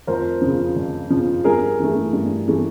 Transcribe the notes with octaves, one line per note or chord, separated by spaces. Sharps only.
F2 A#4 C5
C#3 F3
F2
C#3 F3
G2 G#4 A#4
E3 A3
G2
E3 A3